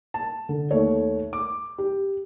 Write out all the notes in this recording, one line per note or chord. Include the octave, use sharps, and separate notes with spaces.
A5
D3
D#2 A3 C#5
D6
G4